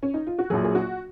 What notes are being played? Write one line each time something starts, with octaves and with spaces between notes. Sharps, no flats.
C#4
D#4
F4
F#4
A#1 A#2 F#3 G#4
G#4
F#4